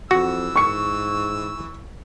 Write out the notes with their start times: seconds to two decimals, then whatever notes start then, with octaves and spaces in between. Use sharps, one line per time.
0.11 F2 E3 F#4 E6
0.56 G#2 C#6 C#7